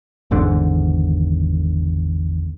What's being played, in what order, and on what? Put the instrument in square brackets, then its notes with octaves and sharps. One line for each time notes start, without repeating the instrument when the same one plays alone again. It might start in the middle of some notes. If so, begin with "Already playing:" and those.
[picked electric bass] G#1 E2 G#2 D3